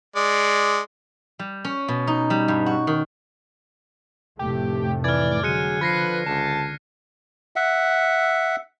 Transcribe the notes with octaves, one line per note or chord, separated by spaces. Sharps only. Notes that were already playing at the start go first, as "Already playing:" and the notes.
G#3 D5
G3
C#4
B2
D#4
G3
G2
F#4
D#3
F1 A2 A3 G4
E3 D5 F6 G#6
D3 F#3 G#3 F#6 C#7 D#7
F3 B4 G#6 A#6 C7
C#2 A5
E5 F#5